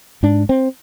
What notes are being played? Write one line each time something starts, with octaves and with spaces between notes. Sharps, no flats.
G#2 D4
C4